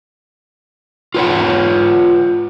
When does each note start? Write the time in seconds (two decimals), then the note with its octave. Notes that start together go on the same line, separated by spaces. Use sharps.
1.15 F4 B4 C#5 F#5